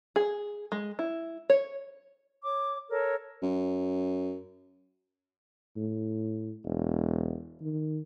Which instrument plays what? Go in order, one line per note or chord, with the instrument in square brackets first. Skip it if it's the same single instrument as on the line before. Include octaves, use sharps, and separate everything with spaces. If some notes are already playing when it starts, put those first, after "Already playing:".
[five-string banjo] G#4
G#3
E4
C#5
[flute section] C#5 D6
A4 A#4 C#5
[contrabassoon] F#2
[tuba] A2
E1
D#3